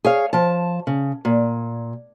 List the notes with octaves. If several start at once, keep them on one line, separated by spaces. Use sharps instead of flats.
G#4 C#5 F5
F3 A5
C#3
A#2